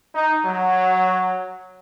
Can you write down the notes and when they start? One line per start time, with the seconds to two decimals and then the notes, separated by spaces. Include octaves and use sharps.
0.14 D#4
0.44 F#3